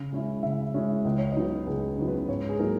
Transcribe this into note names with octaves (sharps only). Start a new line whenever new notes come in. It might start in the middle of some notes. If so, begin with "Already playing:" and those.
Already playing: C#3
G#3 C#4 E4
C#3 E5
G#3 C#4 E4
C#2 D#5
C#5
C#3 F#3 B3 D#4 D#5
C#2 G#4
C#3 F#3 B3 D#4
B4
G#2 C#5
G#4
F#3 A#3 D#4 A#4